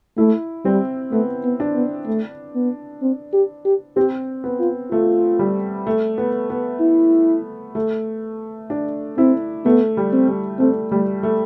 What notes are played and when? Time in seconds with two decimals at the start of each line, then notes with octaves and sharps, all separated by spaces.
0.18 A3 E4
0.65 G3 C4
1.12 A3 B3
1.44 B3
1.60 D4
1.75 B3
2.07 A3
2.55 B3
3.02 C4
3.33 G4
3.65 G4
3.96 C4 G4
4.44 B3
4.59 F4
4.91 A3 F4
5.39 G3
5.87 A3
6.18 B3
6.50 B3
6.81 E4
7.75 A3
8.70 D4
9.18 C4 E4
9.65 A3 B3
9.97 G3
10.13 C4
10.28 G3
10.59 A3 C4
10.91 G3 A3
11.23 A3